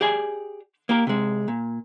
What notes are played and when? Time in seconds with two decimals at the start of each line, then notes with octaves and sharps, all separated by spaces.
0.01 G4 G#4 D5 G#5
0.89 A#3 G4 A#4
1.07 C3 G#3
1.48 A#2